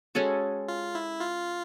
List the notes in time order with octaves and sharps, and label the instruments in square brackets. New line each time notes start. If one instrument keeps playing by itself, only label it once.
[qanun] G#3 C#4 F#4 A4
[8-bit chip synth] F4
E4
F4